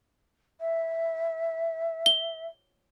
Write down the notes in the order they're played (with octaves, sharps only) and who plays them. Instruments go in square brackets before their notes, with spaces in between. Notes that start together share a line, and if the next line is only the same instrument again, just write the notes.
[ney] E5
[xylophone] G7